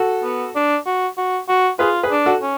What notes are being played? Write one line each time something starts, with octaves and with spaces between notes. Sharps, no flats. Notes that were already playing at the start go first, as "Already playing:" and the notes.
Already playing: F#4 A4
B3
D4
F#4
F#4
F#4
F4 G#4 B4
G#4 B4
D4
F#4 A4
C#4